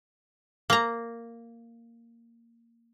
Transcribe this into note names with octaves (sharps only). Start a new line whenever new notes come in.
A#3 A#5